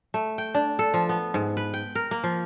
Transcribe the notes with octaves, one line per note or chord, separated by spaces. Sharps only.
A3
G5
D4
A4
F3
B3
G#2
B4
G5
A#4
A#3
F3